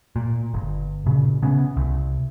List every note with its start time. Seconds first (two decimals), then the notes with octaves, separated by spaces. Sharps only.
0.16 A#2
0.54 G1
1.06 A#2 C#3
1.42 C#3 B3 C#4
1.77 C2